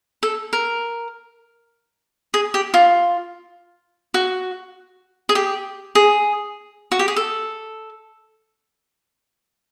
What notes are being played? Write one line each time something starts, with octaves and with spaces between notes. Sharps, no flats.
A4
A#4
G#4
G4
F4
F#4
G#4
G4
G#4
F#4
G4
G#4
A4